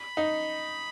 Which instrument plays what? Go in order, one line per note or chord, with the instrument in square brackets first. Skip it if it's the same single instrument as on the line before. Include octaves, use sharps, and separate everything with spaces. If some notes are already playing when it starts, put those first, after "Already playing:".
Already playing: [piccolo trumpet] B5
[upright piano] D#4